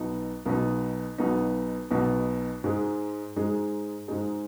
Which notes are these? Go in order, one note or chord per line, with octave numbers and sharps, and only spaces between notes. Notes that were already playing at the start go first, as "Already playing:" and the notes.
Already playing: B1 B2 B3 D#4
B1 B2 B3 D#4
B1 B2 B3 D#4
B1 B2 B3 D#4
G#2 G#3 D#4 G#4
G#2 G#3 D#4 G#4
G#2 G#3 D#4 G#4